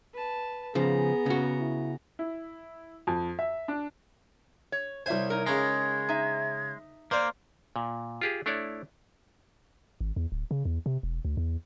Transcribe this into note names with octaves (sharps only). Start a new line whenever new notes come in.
B4 A5
C#3 F3 B3 G#4 A#5
C#3 F#4
E4
E4
F2
E5
D4
C#5
C2 C5 C#5 E5 G#5
D#4 A#4
C#3 G#3 A#5 G#6
D#4 E5
A#3 C5 D5
A#2
F4 G4 G#4
A3 D4 E4 C#5 D5
G#1
E2
D1
C#3
E2
C3
E1
D2
E2